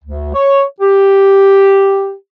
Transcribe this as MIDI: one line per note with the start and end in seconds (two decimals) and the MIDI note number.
0.04 0.30 38
0.34 0.63 73
0.81 2.13 67